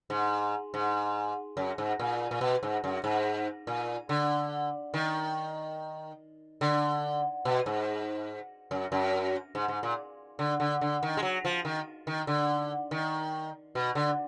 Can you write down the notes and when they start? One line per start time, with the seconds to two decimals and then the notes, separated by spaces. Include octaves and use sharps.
0.10 G#2
0.74 G#2
1.57 F#2
1.78 G#2
2.00 A#2
2.31 A#2
2.41 B2
2.63 G#2
2.84 F#2
3.04 G#2
3.67 A#2
4.09 D3
4.94 D#3
6.61 D3
7.45 B2
7.66 G#2
8.71 F#2
8.92 F#2
9.55 G#2
9.68 G#2
9.83 A#2
10.39 D3
10.60 D3
10.81 D3
11.03 D#3
11.17 G#3
11.23 F#3
11.45 F3
11.65 D#3
12.07 D#3
12.27 D3
12.91 D#3
13.75 B2
13.95 D3